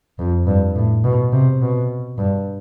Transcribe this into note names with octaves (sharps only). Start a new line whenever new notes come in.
F2
G2
A2
B2
C3
B2
G2